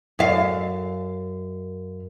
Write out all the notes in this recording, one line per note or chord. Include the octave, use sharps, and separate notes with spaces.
F#2 F5